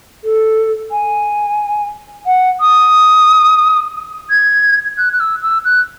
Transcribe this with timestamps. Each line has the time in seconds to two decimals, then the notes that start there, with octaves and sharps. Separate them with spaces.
0.24 A4
0.91 G#5
2.26 F#5
2.61 D#6
4.30 G#6
4.98 F#6
5.13 F#6
5.20 E6
5.42 E6
5.65 F#6